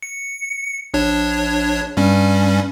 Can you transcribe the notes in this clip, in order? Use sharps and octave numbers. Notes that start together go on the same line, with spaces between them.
C#7
A#1 D4 C#5
G2 G3 C#4